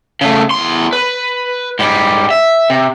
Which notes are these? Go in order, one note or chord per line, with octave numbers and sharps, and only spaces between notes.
C#3 A3
E2 C6
B4
G#2 G3
E5
C3